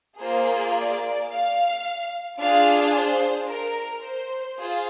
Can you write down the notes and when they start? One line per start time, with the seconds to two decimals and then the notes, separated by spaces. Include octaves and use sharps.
0.20 A#3 F4 G#4 C5
0.75 D5
1.30 F5
2.39 D4 F4 G#4 F5
2.94 C5
3.49 A#4
4.03 C5
4.58 F4 G#4 C5